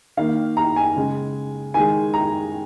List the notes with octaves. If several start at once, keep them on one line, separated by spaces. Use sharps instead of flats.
D#3 A#3 F5
A#5
G#5
C#3 G#3
D#3 G#3 G#5
A#5